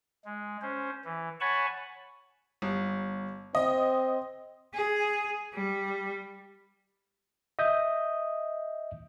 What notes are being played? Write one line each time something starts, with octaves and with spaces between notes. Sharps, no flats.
G#3
C#4 C5
E3
C#5 F#5 G#5 A5 B5 C#6
G1
C4 D#5
G#4
G3
D#5 E5 D#6 G6